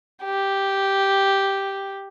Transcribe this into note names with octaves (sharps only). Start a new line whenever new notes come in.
G4